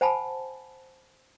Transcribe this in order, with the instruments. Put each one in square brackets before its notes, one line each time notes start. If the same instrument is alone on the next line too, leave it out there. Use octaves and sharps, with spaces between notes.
[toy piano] C5 F#5 G#5 A5 B5